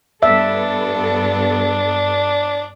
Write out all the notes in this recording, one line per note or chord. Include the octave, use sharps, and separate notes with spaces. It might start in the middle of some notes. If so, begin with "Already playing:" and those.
G2 B3 D4 A4 E5